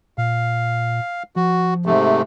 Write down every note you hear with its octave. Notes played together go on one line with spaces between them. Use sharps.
A#2 F5
F3 F#4
G#2 C3 A3